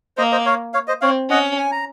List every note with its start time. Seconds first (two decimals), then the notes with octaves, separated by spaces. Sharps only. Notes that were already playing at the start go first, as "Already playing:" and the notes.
0.17 A#3 C5 D#5
0.32 C5 D#5
0.46 C#5 F5
0.74 C#5 F5
0.88 C5 D#5
1.01 C4 C#5 F5
1.29 C#4 D#5 F#5
1.57 G#5
1.72 A#5